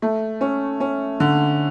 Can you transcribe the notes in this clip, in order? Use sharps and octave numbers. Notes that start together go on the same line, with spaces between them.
A3
C#4
C#4
D3